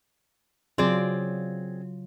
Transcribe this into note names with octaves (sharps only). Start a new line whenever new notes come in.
C#3 F#3 C4 F4 G#4 D5